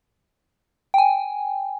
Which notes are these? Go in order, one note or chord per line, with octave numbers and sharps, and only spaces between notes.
G5 G#5